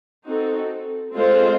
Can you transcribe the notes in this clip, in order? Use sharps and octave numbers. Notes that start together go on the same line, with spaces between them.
C4 D#4 F#4 A4
G#3 C4 F4 A4 C5